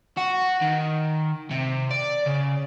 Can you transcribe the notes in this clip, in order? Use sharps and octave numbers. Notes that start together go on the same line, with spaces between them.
F#4
D#3
C3
D5
C#3